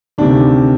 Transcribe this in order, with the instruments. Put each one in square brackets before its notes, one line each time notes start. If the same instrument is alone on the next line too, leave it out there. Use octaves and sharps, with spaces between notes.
[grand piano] D2 C3 D#3 D4